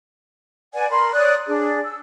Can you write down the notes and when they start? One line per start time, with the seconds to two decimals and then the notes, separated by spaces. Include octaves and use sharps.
0.74 B4 D5 F#5 G#5
0.90 A#4 B5 C6
1.14 C#5 D5 D#6 F#6
1.47 D4 G#4
1.84 E6